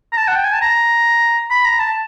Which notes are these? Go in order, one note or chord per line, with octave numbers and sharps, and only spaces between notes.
A#5
A5
F#5
G5
G#5
A5
A#5
B5
A#5
A5